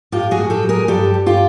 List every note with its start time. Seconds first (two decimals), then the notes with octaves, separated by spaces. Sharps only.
0.12 A2 F4 G4
0.31 F#4 G#4
0.37 A2
0.50 G4 A4
0.63 F#3
0.69 G#4 A#4
0.88 G2 G4 A4
1.14 G2
1.26 F4 G4